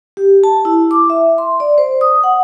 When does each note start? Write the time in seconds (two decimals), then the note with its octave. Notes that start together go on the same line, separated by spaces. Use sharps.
0.17 G4
0.44 A5
0.65 E4
0.91 D6
1.10 E5
1.38 C6
1.60 D5
1.78 C5
2.01 D#6
2.24 F#5